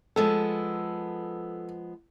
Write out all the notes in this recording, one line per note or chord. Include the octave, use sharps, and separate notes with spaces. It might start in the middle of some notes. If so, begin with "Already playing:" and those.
F3 G#3 B3 A4